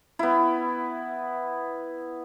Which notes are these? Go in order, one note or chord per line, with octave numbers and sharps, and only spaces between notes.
B3 E4